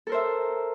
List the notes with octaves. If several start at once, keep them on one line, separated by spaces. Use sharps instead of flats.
A4 A#4 C5 E5